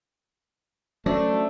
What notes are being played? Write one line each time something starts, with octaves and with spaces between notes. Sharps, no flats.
F#3 A3 C#4 D4 C5